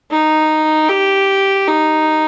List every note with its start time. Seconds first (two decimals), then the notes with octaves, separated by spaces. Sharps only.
0.11 D#4
0.88 G4
1.68 D#4